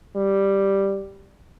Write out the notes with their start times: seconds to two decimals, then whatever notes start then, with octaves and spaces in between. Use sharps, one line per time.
0.16 G3